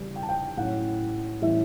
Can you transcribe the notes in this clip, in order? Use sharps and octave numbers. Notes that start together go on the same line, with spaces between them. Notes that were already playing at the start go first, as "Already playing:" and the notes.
Already playing: E2 C#3 E3 G3
G5
A5
G5
A2 F#3 C#4 F#5
A2 E3 G3 C#4 E5